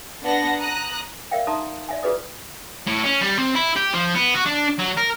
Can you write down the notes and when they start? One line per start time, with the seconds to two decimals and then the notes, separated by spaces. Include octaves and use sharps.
0.23 B3 D4 F#5 A#6
0.60 A#5 D#6 F#6
1.31 A#4 D5 E5 F5 G5
1.47 D#4 E5 A5 A#5 C6 D#6
1.89 D5 E5 G#5
2.03 F4 F#4 G#4 B4 D5 D#6
2.87 A2
3.04 C#4
3.21 G3
3.38 C4
3.55 E4
3.76 G4
3.93 F3
4.15 B3
4.34 F#4
4.46 D4
4.79 F#3
4.97 A#4